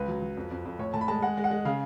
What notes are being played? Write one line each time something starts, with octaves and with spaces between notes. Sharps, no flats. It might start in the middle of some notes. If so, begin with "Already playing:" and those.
Already playing: C#2 B4
F#3
F#3
F2
F2
F2
A2 C#5
A2 A5
B5
G#3 A5
G#3 F#5
G#3
F#5
G#3
C#3 F5